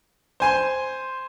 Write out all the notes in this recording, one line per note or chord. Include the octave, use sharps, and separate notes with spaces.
C5 G#5 C6